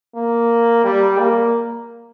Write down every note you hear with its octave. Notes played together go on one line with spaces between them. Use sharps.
A#3
G3
A#3